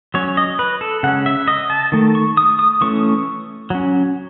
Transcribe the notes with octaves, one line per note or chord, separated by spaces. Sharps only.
F#3 C#4 C#5
D#5
B4
A4
C#3 G#3 C#4 F#5
E5
D#5
A5
D#3 A3
C#6
D#6
D#6
E3 A3 C#4 C#6
F#3 C#4